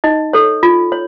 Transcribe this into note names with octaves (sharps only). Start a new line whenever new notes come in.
D#4 D#5
A4 C#5
F4
C#5